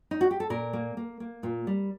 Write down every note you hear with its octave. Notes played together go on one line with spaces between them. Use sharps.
D#4
F#4
G4
A4
A#2 A#4
A#3
A#3
A#3
A#2
G3